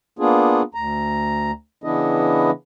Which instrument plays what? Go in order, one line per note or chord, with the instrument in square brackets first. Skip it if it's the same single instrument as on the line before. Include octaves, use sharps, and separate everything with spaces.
[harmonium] A#3 B3 D4 F4 G#4
D2 A#5
C#3 E3 B3 D4 E4 D#5